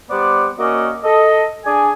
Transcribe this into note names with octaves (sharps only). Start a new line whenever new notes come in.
G3 B3 C5 D5
A#3 C#4 F#4 D5 D#5
A4 D#5
D4 G#4 D5 G#5